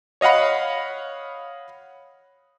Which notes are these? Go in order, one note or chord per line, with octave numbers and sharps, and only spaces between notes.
C#5 D#5 F5 F#5 B5